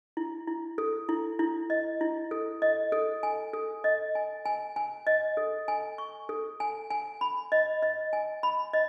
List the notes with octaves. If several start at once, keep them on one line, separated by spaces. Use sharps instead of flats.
E4
E4
A4
E4
E4
D#5
E4
A4
D#5
A4
G#5
A4
D#5
G#5
G#5
G#5
D#5
A4
G#5
C#6
A4
G#5
G#5
B5
D#5
D#5
G#5
B5
D#5